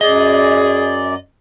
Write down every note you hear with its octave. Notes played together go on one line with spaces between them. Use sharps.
F#2 G#4 D5 D#5